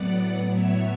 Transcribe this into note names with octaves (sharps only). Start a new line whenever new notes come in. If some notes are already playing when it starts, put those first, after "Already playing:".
Already playing: A2 F#3 B3 D5 F#5
C#5 E5